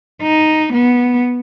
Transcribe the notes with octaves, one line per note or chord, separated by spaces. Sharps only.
D#4
B3